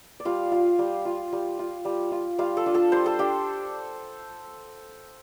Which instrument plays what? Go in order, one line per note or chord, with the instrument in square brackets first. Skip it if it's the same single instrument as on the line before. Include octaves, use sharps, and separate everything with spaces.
[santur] D5
G3 F4 F5
F4
G3
F4
G3
F4
G3
F4
G3 F4 F5
A4 A5
D4 F4
A4 A5
G3 C5 C6
A4 A5
D4 G4 G5